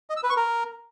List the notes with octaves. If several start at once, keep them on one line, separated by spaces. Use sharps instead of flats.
D#5
E6
B4
C#6
A#4